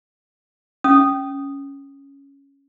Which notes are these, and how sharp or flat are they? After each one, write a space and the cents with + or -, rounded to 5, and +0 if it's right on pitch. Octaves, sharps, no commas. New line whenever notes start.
C#4 +0 D#6 -10